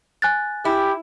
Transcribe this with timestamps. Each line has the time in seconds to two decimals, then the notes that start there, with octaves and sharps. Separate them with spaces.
0.22 G#5 F#6 A6
0.65 E4 G4